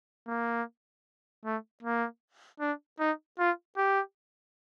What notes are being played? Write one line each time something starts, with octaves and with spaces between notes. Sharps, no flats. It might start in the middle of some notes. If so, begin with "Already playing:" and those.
A#3
A3
A#3
D4
D#4
F4
G4